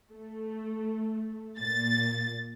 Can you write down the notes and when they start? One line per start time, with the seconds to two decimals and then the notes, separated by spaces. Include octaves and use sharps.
0.11 A3
1.59 A#2 A6